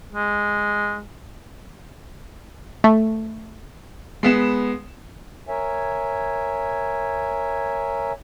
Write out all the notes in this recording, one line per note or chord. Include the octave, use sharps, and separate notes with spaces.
G#3
A3
G#3 B3 E7
A#4 C#5 E5 G#5